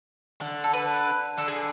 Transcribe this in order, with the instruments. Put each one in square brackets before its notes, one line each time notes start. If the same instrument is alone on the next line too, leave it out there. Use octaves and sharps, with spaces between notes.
[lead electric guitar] D3
[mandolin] A4
B4
[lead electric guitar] D3 [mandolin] A4
[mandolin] G#4